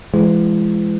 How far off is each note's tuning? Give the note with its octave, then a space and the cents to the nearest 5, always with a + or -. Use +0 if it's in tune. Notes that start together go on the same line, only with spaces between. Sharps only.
E3 +40 G#3 +0